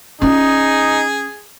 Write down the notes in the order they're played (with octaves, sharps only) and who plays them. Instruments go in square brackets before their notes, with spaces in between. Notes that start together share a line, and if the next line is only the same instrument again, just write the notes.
[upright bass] C#4 F4 [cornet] D#4 [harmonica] G#4